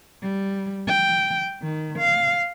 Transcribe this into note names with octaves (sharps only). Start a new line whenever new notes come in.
G3
G5
D#3
F5